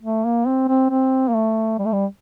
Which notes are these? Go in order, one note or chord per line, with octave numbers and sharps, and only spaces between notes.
A3
A#3
C4
C4
C4
A#3
A3
G3
A3
G3